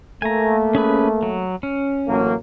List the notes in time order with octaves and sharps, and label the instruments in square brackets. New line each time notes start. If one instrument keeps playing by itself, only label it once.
[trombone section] A3 A#3 [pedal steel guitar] G#5 A#5
[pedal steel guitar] C#4 G#4 B4
F#3
C#4
[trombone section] A1 F#3 A#3